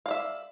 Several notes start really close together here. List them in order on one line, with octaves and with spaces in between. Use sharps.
F5 D5 E5